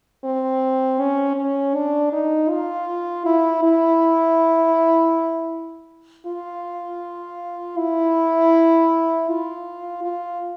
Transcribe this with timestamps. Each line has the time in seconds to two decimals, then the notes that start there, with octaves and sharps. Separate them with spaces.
0.24 C4
0.99 C#4
1.37 C#4
1.75 D4
2.12 D#4
2.50 F4
3.26 E4
3.63 E4
6.27 F4
7.77 E4
9.28 F4
10.04 F4